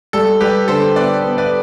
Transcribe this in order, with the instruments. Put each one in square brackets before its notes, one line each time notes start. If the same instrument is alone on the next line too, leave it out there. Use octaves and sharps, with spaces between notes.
[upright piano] G3 [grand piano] A4
[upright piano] G3 [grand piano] G4 B4
[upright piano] D3 [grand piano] A4 C5
[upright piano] B3 [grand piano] B4 D5
[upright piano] B3
[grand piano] B4 D5